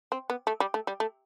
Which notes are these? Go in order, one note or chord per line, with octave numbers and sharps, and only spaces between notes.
C4
B3
A3
G3
A3
G3
A3